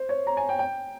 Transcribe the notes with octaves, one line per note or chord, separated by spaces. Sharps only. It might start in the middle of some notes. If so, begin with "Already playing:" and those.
Already playing: C5
C#5
A#5
G#5
G5
G5